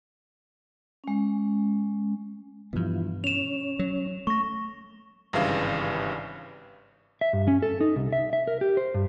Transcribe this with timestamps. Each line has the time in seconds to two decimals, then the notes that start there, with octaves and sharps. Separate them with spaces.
1.04 G#3 C#4
2.73 G2 B2 E3 F3
3.24 C#4 E7 F7
3.79 F#3
4.27 A3 C#6 A#6
5.33 G#1 G2 C#3 E3 F5
7.21 E5
7.33 G2
7.48 C#4
7.62 A4
7.81 D#4
7.96 C2
8.13 E5
8.33 E5
8.47 A#4
8.61 G4
8.77 C5
8.94 G2